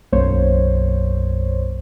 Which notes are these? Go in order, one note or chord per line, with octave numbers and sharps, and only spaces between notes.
B1 F#2 A#3 C5 C#5